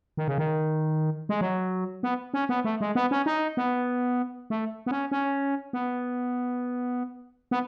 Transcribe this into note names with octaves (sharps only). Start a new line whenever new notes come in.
D#3
C#3
D#3
G#3
F#3
B3
C#4
B3
A3
G#3
B3
C#4
D#4
B3
A3
B3
C#4
C#4
B3
B3